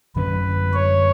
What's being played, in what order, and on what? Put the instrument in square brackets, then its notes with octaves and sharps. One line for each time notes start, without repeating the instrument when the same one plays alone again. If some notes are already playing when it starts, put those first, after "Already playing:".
[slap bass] F#2 D3 F#3 C#4 [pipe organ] B4
[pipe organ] C#5